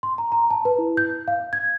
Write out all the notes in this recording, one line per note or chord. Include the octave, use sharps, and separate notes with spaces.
C6
A#5
A#5
A5
B4
E4
G6
F5
G#6